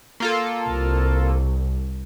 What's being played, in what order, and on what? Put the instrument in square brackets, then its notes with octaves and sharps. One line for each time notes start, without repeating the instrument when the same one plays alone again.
[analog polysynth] A#3 F4 A4
[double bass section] C2